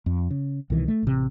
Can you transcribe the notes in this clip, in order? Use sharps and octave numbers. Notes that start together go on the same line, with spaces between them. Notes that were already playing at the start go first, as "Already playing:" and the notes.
F2
C#3
C2 B2 D#3 E3
A3
A1 C3